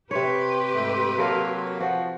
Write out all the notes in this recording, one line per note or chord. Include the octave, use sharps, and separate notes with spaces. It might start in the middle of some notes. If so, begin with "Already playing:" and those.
C3 G4 B4 C#5 C6
G#2 A3
F#3 A#3 A4 A#4 F5
F3 F#4